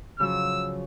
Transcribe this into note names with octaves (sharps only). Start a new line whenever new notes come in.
C#3 F3 F#3 E6